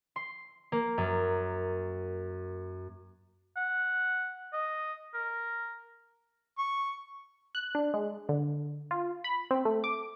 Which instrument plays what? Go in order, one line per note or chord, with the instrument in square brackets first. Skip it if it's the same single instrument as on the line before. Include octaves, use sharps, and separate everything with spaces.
[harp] C6
A#3
F#2
[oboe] F#5
D#5
A#4
[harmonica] C#6
[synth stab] F#6
D4
G#3
D3
F4
B5
C4
A3
D6